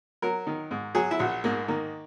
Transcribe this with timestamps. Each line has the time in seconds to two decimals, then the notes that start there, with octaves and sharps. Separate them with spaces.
0.22 F#3 A#4
0.47 D#3
0.71 G#2
0.95 F#3 G#4
1.11 E4
1.19 A#1 F#4
1.44 G#2 A#3
1.68 D#3 A#3